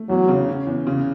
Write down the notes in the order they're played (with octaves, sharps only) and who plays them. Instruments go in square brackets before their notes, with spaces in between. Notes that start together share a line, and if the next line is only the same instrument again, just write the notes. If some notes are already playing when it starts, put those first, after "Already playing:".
Already playing: [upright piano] A3
[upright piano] E2 [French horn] F#3
[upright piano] C#3
C#4
E2
C#3